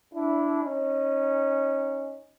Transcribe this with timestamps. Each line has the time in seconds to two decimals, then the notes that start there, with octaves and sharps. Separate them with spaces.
0.13 D4 E4
0.63 C#4 D#4